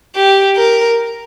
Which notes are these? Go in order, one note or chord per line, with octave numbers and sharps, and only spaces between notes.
G4
A#4